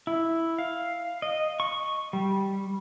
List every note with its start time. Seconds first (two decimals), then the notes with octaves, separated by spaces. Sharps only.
0.07 E4
0.58 F5
1.22 D#5
1.60 C#6
2.13 G3